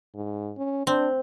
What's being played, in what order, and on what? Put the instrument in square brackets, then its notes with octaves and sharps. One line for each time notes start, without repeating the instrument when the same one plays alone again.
[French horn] G#2
C#4
[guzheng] C4 [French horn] D4